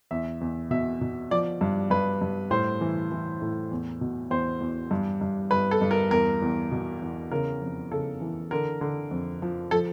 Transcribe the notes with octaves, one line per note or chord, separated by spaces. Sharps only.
E2 E5
E2
B2 E5
B2
F3 D5
G2
G2 B4
G2
A2 C5
E3
E3
A2
E2
B2
E2 C5
E2
G2
G2
G2 B4
A4
G2
A#4
E2 A#4
E2
B2
E2
C#3 A#4
F2
C#3 A4
E3
D3 A#4
D3
F2
F3
F3 A4